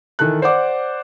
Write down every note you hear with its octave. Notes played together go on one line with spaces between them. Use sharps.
D#3 E3 A4 F#6
C5 D5 F#5 D6